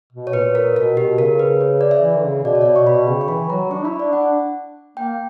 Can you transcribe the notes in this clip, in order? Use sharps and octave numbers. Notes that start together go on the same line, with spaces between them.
B2
C#5
A#2 B4
A#4
B2 A#4
B2 G4
C#3 A#4
B4
C#5
D5
E5
E3
D3
C#3
B2 D5
C#5
D5
B2 E5
C#6
B2 B5
C#3 G5
C#6
E3 B5
F#3 A#5
D4 C#6
E4 B5
D4 D5
D4 F#5
A#3 G5